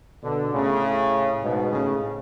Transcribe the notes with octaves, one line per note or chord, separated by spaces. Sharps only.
B2 D3
A2 C#3
G#2 B2
A2 C#3